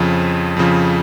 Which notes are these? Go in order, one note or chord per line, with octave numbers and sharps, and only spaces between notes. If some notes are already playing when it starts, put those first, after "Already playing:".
Already playing: F2 C#3 F3
F2 C#3 F3